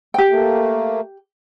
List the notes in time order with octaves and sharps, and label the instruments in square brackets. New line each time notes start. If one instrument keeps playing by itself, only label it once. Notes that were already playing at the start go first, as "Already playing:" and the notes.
[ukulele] G4 G5
[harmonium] A3 A#3